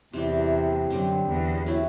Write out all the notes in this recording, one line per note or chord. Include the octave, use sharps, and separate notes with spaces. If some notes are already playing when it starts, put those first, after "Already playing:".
E2 C3 E3 G3
F#2 D3 G3 C4
E2
F#3 C4 E4 A4